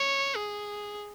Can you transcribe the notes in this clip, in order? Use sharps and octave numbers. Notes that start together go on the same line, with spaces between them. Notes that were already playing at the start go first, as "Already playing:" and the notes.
Already playing: C#5
G#4